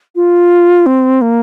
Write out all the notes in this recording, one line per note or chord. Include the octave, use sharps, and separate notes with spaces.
F4
C4
A#3